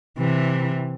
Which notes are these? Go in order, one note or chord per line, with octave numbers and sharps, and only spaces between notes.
C3 E3